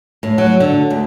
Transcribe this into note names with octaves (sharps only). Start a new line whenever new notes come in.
A2
F#3
D3
D2